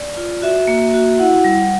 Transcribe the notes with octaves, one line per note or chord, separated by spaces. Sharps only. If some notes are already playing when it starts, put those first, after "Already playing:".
Already playing: D5
F4
F#4 E5
A#3
F#4
E4 F#5
G3